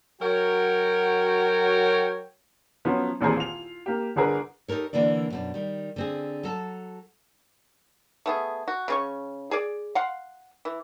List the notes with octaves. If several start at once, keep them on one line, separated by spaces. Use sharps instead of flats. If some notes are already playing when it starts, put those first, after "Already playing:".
F#3 F#4 A#4 C#5 G5
F3 F#3 B3 C#4
D#1 A1 A#2 C4 G#4 A#5
F4 F7
A#3 G4
G1 D3 G#4 A#4 B4
D#4 G4 A4 A#4 C#5
D3 E3 A#3 D4 D5
F#2 B2 D4
D#3 G3
D3 C4 G#4
F#3 A4 E5 A5
A3 B3 G#4
F#4
C#3 C#4 C#6
G#4 D5
F5 F#5 C6
E3